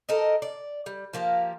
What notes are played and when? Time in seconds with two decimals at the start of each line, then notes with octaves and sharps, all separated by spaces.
0.09 A4 A#4 C5 D#5
0.42 D5
0.86 G3
1.13 F3 A#3 G4